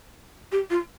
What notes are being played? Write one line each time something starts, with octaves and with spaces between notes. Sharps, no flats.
G4
F4